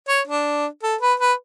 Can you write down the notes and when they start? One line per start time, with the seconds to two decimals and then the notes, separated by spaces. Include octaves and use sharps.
0.08 C#5
0.28 D4
0.83 A4
1.01 B4
1.20 B4